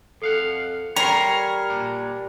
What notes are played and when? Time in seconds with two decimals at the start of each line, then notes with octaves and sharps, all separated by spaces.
0.22 F2 A4 F5 F#5
0.96 G3 A#4 C#5 C6 C#7
1.70 A#2 D4